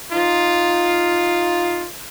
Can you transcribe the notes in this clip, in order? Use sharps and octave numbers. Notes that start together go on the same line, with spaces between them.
D#4 F4